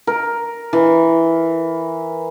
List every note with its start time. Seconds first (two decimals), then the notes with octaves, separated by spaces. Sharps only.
0.07 A#4
0.73 E3